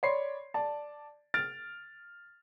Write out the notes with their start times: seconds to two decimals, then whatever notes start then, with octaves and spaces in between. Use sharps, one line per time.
0.03 C#5 D5 B5 C6 C7
0.54 D5 A5
1.34 F6 A6 D7